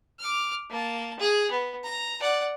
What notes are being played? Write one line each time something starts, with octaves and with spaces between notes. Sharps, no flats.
D6 F6
A#3 A5
G#4
B3
A#5
D5 F#5